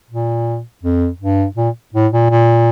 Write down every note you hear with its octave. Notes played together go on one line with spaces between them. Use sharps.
A#2
F2
G2
A#2
A2
A#2
A#2